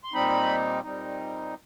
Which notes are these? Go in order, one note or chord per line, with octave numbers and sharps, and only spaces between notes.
C6
A#2 G3 C4 D#4 B5
A#2 G3 C4 D#4